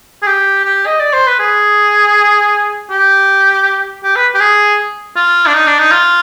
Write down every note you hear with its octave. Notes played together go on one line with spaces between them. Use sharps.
G#4
G4
G4
D#5
D5
C5
B4
G#4
G4
G4
B4
G4
G#4
F4
D4
D#4
D4
D#4
F4